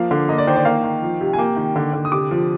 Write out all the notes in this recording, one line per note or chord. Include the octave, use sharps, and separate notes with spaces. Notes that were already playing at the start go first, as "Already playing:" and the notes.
Already playing: F3 A#3 F5
D3
A#3 D#5
D5
D#3 C5
D5
A#3 F5
D#3
F3
C3
G#5
A#3 G5
D#3
D3
D3
D#6
C3 D6
F3